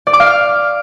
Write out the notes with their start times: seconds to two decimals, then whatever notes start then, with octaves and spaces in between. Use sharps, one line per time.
0.07 D5
0.13 D6
0.20 F5
0.26 F6